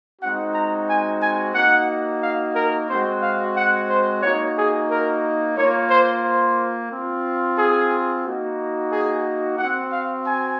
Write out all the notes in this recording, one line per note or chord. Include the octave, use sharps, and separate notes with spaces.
G#3 C4 D#4 F#4 F#5
A#5
G#5
G#5
A#3 D#4 F#4 F#5
F5
A#4
G#3 C4 F#4 C5
F5
F#5
C5
A#3 D#4 F#4 C#5
G#4
A#4
A#3 F4 C#5
C5
C5
C4 F4
G#4
A#3 D#4 F#4
G#4
C4 F#4 F#5
F5
G#5